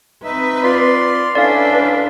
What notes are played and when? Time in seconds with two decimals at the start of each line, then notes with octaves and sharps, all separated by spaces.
0.24 C4 D#4 B4 E5
0.63 F4 D5 C6
1.35 C#4 D4 E4 F4 A4 B4 D5 F5